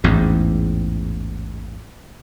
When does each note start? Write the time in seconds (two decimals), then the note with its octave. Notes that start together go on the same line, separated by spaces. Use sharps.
0.04 A1 E2 G#2